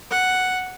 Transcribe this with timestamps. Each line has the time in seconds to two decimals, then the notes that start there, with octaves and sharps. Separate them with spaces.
0.11 F#5